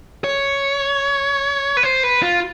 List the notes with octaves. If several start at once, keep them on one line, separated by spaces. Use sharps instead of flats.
C#5
B4
C5
B4
F4